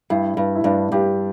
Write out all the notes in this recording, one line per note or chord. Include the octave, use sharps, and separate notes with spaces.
G2 E4
G2
E4
G2 D4
G2 G4